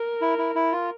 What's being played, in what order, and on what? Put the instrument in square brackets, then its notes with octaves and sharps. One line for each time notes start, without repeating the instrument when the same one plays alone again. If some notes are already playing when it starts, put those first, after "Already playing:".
Already playing: [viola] A#4
[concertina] E4
E4
E4
F4